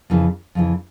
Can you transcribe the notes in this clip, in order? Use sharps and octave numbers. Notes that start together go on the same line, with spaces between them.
F2 C#3 E3
F2 C#3 E3